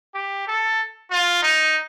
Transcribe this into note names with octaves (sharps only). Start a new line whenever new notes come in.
G4
A4
F4
D#4